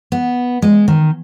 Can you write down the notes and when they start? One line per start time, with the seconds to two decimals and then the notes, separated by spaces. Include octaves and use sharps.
0.12 B3
0.62 G#3
0.88 D#3